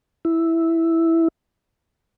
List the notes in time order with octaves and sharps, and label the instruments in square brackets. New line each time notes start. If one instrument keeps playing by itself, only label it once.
[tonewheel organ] E4